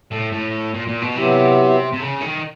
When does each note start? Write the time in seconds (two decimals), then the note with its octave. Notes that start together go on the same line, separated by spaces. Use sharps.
0.11 A2
0.32 A2
0.74 A#2
0.87 A#2
1.01 B2
1.15 C3 F#3 B3 E4 G4
1.92 C3
2.00 C#3
2.20 D#3